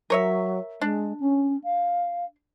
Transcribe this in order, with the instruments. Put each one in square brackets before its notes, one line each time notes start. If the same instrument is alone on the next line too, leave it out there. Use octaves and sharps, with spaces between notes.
[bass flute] F#3 [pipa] A#4 C#5 E5
[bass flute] G#3 [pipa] D4
[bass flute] C#4
F5